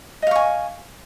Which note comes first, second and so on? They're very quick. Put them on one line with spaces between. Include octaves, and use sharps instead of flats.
D#5 F5 C#6 G#5